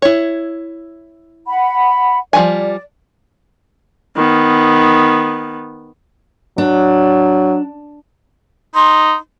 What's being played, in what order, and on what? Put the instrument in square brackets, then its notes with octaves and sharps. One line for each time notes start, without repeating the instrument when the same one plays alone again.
[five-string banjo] E4 C#5
[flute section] F#5 B5
[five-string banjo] F3 G3 G#5 [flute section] D5
[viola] D#3 B3
[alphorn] F#3 [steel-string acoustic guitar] D4
[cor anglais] D#4 [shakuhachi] C6